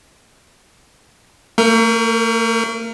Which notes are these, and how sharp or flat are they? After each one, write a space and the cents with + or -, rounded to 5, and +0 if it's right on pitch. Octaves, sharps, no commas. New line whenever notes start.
A3 +45 A#4 +0